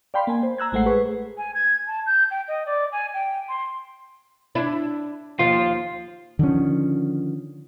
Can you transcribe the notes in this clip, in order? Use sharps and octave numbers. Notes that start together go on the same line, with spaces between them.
D5 F5 G5 B5 C6
A#3 G#5
C5
A#5 E6 F#6 G#6
A1 G#3 A3 C5 F#5 C7
G#4 B4 C#6
G#5
G#6
A5
G6
G5
D#5
D5
G#5
G5
C6
D4 E4
D#2 F3 F4
D3 D#3 F3 C#4